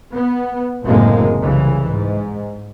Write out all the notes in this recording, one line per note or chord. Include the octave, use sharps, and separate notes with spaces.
B3
F#1 F#2 A2 C3 G#3 A#3
C2 C#3 E3
G#2